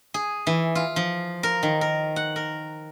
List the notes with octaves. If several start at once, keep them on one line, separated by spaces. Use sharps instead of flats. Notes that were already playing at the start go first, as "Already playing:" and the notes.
G#4
E3
F4
F3
A#4
D#3
A#4
F#5
A#4